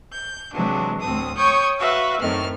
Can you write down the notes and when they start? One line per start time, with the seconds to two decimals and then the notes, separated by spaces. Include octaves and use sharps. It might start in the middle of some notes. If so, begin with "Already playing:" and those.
0.13 G6
0.52 C3 E3 F#3 G#3 D4
1.00 D2 A2 C4 D#6
1.36 C#5 G5 C#6 D#6 G6 G#6
1.78 F#4 B4 E5 F5
2.20 F#2 A2 D#3 C4 F6